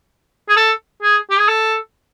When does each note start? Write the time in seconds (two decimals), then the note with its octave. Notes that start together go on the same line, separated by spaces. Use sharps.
0.49 G#4
0.57 A4
1.02 G#4
1.30 G4
1.39 G#4
1.48 A4